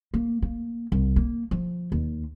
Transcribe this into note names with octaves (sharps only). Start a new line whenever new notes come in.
A#3
A#3
C2
A#3
F3
D#2